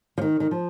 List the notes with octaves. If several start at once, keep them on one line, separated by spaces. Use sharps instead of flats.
F3
D#3
D#3
F3